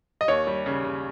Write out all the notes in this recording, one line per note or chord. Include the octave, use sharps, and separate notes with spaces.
D#5
D#2 C#5
G3
C#3
C#3